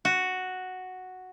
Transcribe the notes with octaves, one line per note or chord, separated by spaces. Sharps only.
F#4